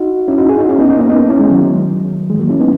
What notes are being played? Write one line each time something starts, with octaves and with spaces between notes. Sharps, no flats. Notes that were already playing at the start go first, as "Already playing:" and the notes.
Already playing: D#4 F#4
C#4 E4
D#4 F#4
E4 G#4
D#4 F#4
C#4 E4
B3 D#4
B3 D#4
A#3 C#4
B3 D#4
C#4 E4
G#3
D#3 F#3
E3 G#3
F#3 A#3
C#4 E4
B3 D#4